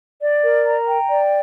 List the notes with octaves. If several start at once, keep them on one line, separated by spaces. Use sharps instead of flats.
D5
A#4
A#5
G5
D5